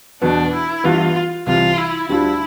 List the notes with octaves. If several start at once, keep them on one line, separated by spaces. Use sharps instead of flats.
E2 B2 B3 D4
E4
G2 E3 B3 F4
C2 C3 E3 F4
E4
D2 D3 G3 D4 E4 F4